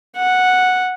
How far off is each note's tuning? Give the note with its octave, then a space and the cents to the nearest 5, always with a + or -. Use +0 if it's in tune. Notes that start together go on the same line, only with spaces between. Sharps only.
F#5 -5